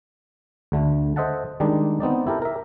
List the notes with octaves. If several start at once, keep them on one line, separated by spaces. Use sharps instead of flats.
D2 D3 A3
A4 C5 D#5 E5 F#5 A5
D#3 G3 G#3 D4 D#4
B3 C4 D#4 D5
E4 G4 A4 A#4
A#4 E5